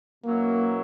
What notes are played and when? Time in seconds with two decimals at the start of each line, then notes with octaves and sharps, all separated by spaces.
0.24 B2 F#3 A#3 C#4 E4